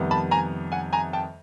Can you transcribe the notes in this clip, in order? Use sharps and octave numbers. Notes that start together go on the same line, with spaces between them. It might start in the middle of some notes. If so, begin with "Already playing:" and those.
Already playing: F2 C3 D#3 G3 B3
A5 B5
G#5 A#5
F#5 G#5
G#5 A#5
G5 A5